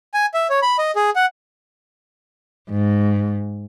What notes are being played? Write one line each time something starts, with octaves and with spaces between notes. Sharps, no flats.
G#5
E5
C#5
B5
D#5
G#4
F#5
G#2